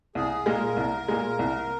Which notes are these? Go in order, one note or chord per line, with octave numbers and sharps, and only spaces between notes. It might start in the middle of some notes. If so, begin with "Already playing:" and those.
C2 G#4
A#2 G#3 A#4
C2
A#2 G#3
C2